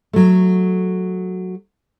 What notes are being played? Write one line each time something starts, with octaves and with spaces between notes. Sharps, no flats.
F#3 A3